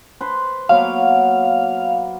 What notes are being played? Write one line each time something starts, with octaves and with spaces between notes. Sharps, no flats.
B4 C5
F#3 A#3 B3 F5